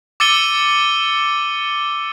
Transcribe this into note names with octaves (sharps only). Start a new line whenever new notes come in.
D6 E6 A6 C#7 D#7 G7